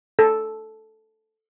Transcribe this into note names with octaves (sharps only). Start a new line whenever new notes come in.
A4